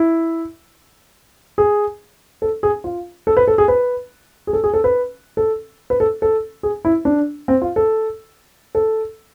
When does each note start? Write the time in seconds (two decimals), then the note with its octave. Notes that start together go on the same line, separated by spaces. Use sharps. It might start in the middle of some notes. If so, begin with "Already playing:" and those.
Already playing: E4
1.58 G#4
2.42 A4
2.63 G#4
2.84 F4
3.27 A4
3.37 B4
3.48 A4
3.58 G#4
3.68 B4
4.47 G#4
4.53 A4
4.64 G#4
4.74 A4
4.84 B4
5.37 A4
5.90 B4
6.00 A4
6.22 A4
6.63 G#4
6.85 E4
7.05 D4
7.48 C4
7.62 F4
7.76 A4
8.75 A4